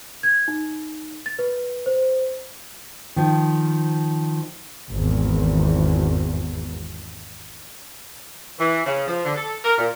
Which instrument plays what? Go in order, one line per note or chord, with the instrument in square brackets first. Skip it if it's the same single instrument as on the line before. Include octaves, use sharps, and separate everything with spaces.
[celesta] G#6
D#4
A6
B4
C5
[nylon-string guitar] D#3 F3
[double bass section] G#1 E2
[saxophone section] E3
C#3
F3
D3
A4
A#4
A#2